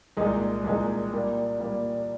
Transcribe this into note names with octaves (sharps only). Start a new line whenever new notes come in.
C2 A#2 G#3 D#4
C2 A#2 G#3 D#4
A#2 G3 A#3
A#2 G3 A#3